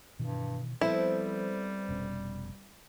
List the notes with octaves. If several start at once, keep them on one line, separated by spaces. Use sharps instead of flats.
G2 B2 D#3 E3
F3 G3 B3 C4 E4 A4
F1 B2 C#4